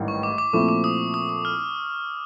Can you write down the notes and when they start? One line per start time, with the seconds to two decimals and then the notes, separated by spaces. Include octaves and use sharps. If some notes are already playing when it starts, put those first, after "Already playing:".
Already playing: A1 G#2 D#3 G3
0.08 C#6
0.23 D6
0.38 D6
0.53 A#2 F3 A3 C4 E4 C#6
0.69 D6
0.84 D#6
1.14 D#6
1.29 D#6
1.45 F6